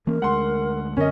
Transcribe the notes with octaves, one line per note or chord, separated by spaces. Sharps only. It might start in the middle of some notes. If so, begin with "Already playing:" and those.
E3 A#3 C#4 A#4
D2 G#3 F#5 C6
F#2 D3 C#4 A#4 D#5